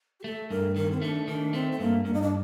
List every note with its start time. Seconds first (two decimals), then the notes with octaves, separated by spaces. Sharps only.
0.20 G4
0.24 A3 A4
0.50 G2 A#4
0.75 D#3 A#4
0.91 C4
1.01 A3 D4
1.27 D#3 D4
1.53 A3 C4
1.72 C4
1.79 G2 A#3
2.05 G2 A#3
2.14 D#4
2.22 D4